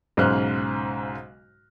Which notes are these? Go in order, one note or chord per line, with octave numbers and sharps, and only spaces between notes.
B1 G#2 C#3 C5 F6 F#6